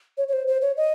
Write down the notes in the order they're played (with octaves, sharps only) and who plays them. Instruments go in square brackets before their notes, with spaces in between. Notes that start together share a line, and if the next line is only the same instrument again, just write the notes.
[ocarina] C#5
C#5
C5
C5
C#5
D#5